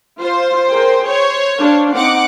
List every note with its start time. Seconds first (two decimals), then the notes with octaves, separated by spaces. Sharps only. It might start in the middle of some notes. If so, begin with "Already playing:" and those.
0.20 F4 C5
0.70 G#4 A#4 G5
1.07 C5 C#5
1.58 D4 C5 F5
1.95 C4 D#4 F#5 D6